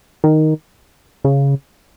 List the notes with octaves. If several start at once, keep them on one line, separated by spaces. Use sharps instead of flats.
D#3
C#3